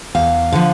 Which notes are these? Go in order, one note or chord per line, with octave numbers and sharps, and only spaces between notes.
E2 F5
D3 F3